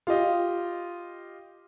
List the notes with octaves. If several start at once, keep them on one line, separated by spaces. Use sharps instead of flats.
F4 G4 D#5